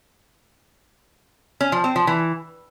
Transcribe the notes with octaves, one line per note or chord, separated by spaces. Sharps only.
C#4
F3
C4
F3
E3